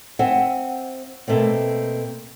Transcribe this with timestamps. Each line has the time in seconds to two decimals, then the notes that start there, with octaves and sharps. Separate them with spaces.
0.19 C4 C5 E5 F#5 G#5
1.28 B2 A3 A#3 C4